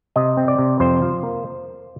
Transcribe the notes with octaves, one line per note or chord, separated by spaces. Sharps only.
C3 D#5
C4
D5
C3
F2 C5
F3
A#3